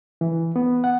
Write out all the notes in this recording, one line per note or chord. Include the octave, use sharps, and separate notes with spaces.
E3
B3
F#5